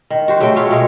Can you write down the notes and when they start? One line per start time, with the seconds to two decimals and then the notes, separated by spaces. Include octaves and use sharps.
0.10 D#3
0.28 F#4 G4 C5
0.41 C#3 F#3 A3 G5
0.56 F4 C#5 E5
0.71 B2 G#3 C#5